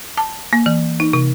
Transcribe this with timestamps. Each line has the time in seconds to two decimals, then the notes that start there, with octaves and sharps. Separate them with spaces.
0.18 A5
0.53 A#3
0.66 E3
1.00 D#4
1.13 C3